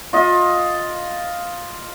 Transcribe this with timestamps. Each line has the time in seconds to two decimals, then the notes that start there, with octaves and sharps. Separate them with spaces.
0.13 F4 D#5